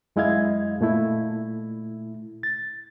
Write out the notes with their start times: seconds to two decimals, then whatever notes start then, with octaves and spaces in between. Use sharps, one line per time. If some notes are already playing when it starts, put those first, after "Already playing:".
0.16 F#2 G#3 E4 D#5 F5 G#6
0.81 A#2 A3 E4
2.43 A6